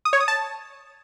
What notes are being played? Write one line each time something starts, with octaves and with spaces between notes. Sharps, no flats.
D#6
C#5
D#6
A5